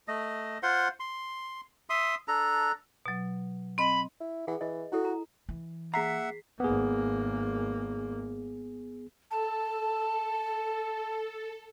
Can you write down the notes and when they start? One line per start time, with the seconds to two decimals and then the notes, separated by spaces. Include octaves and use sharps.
0.08 A3 D#5
0.63 F4 C5 F#5 C6
1.00 C6
1.90 E5 C6 D#6
2.28 D4 A4 A#5
3.06 B2 F#3
3.78 C4 D#5 B5
4.20 E4
4.47 E3 G#4 F#5
4.61 E3 D#5
4.92 E4 F#4 A4
5.05 A#5
5.49 E3
5.94 A#3 G#4 E5 F#5 A#5 B6 C7
6.60 G#1 A#3 B3 G#4
9.31 A4 A5